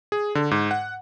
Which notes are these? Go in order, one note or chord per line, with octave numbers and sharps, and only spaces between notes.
G#4
D3
G#2
F#5